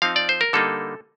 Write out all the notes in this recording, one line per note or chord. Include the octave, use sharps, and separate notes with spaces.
F3 C4 D#4 F5
D5
C5
A#4
D3 G3 A#3 D#4 A4